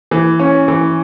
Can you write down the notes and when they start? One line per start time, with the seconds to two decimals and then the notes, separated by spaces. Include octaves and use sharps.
0.11 E3
0.39 C#4
0.68 E3